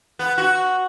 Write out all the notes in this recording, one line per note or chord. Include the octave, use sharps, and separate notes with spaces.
B3
F#4